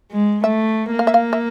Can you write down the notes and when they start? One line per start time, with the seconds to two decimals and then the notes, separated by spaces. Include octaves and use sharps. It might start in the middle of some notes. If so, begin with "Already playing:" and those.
0.11 G#3
0.44 A3 E5
0.92 A#3
0.99 F5
1.07 E5
1.14 F5
1.33 E5